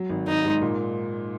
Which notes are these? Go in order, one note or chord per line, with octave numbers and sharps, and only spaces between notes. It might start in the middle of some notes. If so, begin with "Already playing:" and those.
Already playing: F#3
G#1
G#1 D#4
G#2
A#2